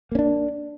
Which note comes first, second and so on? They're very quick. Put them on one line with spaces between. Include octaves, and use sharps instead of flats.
A#3 C#4 D4